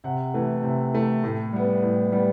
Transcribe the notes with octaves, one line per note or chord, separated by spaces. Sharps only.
C3 F#5
E3 A3
C3
E3 A3
A2
G3 B3
A2
G3 B3